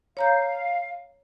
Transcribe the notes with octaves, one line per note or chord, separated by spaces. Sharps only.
C#5 F5 A#5 G6